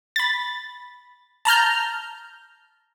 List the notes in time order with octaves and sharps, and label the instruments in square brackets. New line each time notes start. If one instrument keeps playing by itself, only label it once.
[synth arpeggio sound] B5 A6
A5 A#5 F6 G6